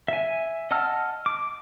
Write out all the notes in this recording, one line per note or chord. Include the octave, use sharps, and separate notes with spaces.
E5 G#5
D#5 F#5 A5 E6 F6
D6